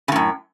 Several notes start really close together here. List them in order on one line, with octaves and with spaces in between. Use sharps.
C#3 A2 F#2